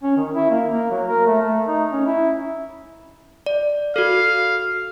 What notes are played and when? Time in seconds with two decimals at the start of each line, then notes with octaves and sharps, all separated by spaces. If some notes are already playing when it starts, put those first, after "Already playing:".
0.03 C#4
0.17 D#3
0.34 E4
0.50 A#3
0.68 A#3
0.91 F#3
1.08 A#4
1.26 A3
1.41 A3
1.68 D#4
1.92 C#4
2.06 E4
3.46 D5
3.96 F#4 A4 F5